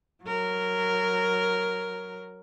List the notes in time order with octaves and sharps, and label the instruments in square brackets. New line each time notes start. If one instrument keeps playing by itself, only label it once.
[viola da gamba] F#3 A#4